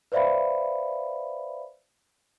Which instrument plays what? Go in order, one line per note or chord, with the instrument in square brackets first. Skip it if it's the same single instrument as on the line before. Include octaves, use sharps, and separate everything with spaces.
[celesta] B4 C5 D5 E5 F5 B5